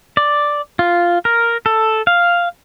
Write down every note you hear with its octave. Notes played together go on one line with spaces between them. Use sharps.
D5
F4
A#4
A4
F5